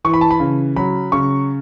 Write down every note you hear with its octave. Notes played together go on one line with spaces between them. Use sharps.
E3 C#6
B5
A5
B5
C#3
F#3 B5
C#3 C#6